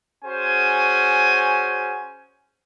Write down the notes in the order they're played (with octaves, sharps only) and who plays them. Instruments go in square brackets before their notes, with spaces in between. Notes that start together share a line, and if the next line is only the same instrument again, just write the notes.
[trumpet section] C#4 F#4 G#4 C5 G#5